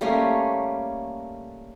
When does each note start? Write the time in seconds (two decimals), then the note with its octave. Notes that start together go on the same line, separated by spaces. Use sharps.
0.01 G3 A3 A#3 C#4